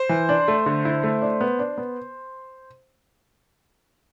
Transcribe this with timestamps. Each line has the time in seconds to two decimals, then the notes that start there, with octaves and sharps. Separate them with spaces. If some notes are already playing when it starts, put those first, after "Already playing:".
Already playing: C5
0.09 E3
0.29 D4
0.48 A3
0.66 D3
0.85 E4
1.03 A3
1.21 D4
1.41 B3
1.59 D4
1.78 B3